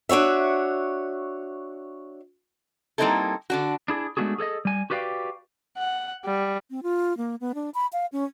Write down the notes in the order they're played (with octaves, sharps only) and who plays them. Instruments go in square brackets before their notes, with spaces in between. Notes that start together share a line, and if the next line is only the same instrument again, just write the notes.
[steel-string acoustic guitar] D4 F#4 C#5 E5
[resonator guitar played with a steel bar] G3 A#3 C4 D#4 E4 A4
D3 D4 F#4
[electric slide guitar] D4 E4 G#4
G#3 A3 B3 D4 F#4 G#4
G#4 A4 C#5 D#5
G3 G#5
F#4 G4 B4 D5 F5 G5
[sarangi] F#5
G3
[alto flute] C4
F4
A#3
B3
D4
B5
F5
C#4